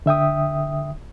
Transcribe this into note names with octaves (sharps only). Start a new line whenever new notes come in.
D3 E5 G5 D#6